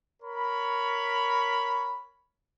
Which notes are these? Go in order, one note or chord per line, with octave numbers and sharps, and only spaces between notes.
A#4 C#5 B5